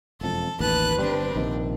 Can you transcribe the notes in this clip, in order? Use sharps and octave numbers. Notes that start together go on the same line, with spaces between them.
E1 F2 A4
A1 D#2 B4 A5 F#6
G1 G3 C4 D4
A#1 C3 D#3